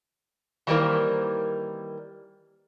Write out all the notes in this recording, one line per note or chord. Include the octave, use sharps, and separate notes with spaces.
D#3 E3 G3 A#3 A#4 C5